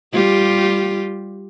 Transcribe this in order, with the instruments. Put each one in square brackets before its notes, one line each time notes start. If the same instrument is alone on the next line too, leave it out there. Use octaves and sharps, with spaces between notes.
[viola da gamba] G3 F4 G4